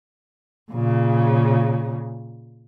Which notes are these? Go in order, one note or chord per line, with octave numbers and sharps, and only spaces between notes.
A#2 C#3